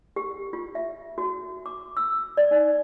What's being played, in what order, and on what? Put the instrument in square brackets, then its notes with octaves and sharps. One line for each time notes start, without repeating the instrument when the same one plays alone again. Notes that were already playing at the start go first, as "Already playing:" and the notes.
[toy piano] G4
F4
E5
F#4
D6
E6
D5
D#4